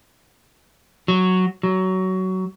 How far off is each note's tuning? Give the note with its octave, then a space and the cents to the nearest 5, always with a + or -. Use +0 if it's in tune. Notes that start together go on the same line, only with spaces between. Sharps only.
F#3 +0
F#3 +20